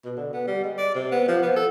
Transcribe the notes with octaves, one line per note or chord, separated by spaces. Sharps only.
B2
D3
B3
G3
G#3
D5
C3
B3
F3
B3
A4